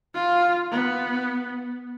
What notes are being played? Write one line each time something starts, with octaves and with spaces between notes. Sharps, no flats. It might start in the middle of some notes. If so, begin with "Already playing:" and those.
F4
B3